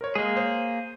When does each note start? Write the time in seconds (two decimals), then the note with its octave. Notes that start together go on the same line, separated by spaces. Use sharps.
0.01 A#4 C5 C#5
0.15 G#3 A#3 G#4
0.36 C5 C#5